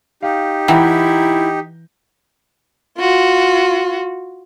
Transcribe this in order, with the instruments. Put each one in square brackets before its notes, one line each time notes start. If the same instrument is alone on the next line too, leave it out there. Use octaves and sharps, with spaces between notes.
[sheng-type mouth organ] D#4 G4 [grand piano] F5
[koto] E3 [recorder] E4 [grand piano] F#5 G5 A#5
[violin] F4 F#4